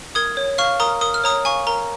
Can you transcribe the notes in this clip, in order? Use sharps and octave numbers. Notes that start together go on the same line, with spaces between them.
A#4 D#6 G#6
C#5
F5 C#6 F6
A#4 A#5 D#6
A#4 D#6
F6
C#5 A#5 D#6
F5 G#5 C#6
A#4 A#5